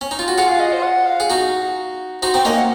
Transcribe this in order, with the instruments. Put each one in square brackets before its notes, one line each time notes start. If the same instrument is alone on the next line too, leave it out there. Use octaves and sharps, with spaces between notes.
[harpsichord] C#4
D#4
F4
F#4
[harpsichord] F4 G#4 [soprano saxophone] F#5
[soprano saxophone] F5
D#5
C5
F#5
F5
[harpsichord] G#4
D#4 F#4
[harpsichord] D#4 F#4 [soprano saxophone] C5
[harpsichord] C4 D#4
[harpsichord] A#3 C#4 [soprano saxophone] D#5
[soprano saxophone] F#5